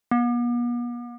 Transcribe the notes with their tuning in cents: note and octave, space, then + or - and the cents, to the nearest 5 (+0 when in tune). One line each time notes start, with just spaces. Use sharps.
B3 -45